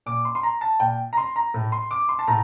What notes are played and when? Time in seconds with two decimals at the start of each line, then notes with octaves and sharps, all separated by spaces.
0.06 A#2 D6
0.25 C6
0.35 C6
0.43 A#5
0.61 A5
0.80 A#2 G5
1.13 A#5
1.17 C6
1.36 A#5
1.54 A2
1.72 C6
1.91 D6
2.09 C6
2.19 A5
2.28 A2 A#5